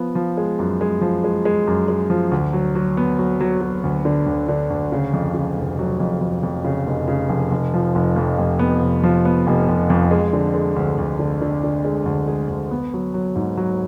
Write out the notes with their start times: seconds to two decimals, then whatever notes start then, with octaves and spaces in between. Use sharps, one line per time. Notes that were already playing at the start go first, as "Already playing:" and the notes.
Already playing: F3 B3
0.15 F3
0.37 G#3
0.59 F#2
0.81 G#3
1.01 F3
1.24 G#3
1.45 G#3
1.67 F#2
1.88 G#3
2.10 F3
2.31 D2
2.53 F#3
2.75 F#3
2.97 B3
3.19 F#3
3.40 F#3
3.61 F#3
3.84 D2
4.05 D3
4.26 D2
4.48 D3
4.70 D2
4.92 C#3
5.13 F2
5.34 C#3
5.56 F1
5.79 F#3
6.00 F2
6.21 F2
6.43 F2
6.64 C#3
6.86 F1
7.08 C#3
7.29 F1
7.51 F1
7.74 F3
7.95 F1
8.16 F2
8.38 F1
8.59 B3
8.82 F1
9.03 F3
9.25 B3
9.47 F1
9.69 F1
9.90 F2
10.11 G#3
10.33 D3
10.54 G#3
10.76 D2
10.98 D2
11.19 D3
11.41 D3
11.63 D3
11.85 G#3
12.06 D2
12.28 G#3
12.49 D2
12.71 B3
12.93 F#3
13.14 F#3
13.36 G#2
13.57 F#3